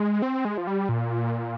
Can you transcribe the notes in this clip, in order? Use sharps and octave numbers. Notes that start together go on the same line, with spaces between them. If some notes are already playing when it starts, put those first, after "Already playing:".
Already playing: G#3
C4
G#3
F3
G3
A#2